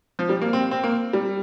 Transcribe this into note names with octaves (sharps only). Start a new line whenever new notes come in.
F3
G3
A#3
C4
C4
A#3
G3